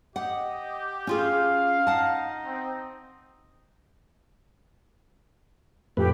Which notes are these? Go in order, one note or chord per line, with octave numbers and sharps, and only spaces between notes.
G4 D#5 F#5
C#4 F4 G#4 F5
D#4 F#5 A5
C4
F2 A2 G4 B4